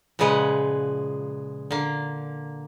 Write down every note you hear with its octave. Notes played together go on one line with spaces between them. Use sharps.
A#2 C#3 F3 G#3 B4 F#5
D3 A#3